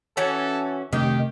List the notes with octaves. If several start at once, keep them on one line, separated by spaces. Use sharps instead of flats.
E3 C#4 F#4 A4
C3 D#3 A3 D4 G4